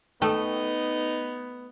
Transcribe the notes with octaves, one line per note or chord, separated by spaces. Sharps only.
A3 B3 D#4 A4 G5